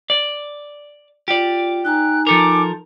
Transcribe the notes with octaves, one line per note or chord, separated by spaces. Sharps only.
D5
F4 G4 D5
D#4 G#5 A#5 F#6
F3 A4 A#4 D6